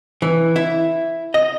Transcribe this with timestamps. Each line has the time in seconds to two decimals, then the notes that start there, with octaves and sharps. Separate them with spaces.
0.22 E3
0.56 E4
1.34 D#5